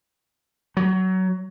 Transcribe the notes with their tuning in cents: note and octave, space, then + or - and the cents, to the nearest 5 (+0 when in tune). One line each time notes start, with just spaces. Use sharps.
F#3 +20